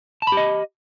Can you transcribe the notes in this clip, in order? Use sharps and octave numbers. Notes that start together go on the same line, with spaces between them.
G4 D#5 A5 B5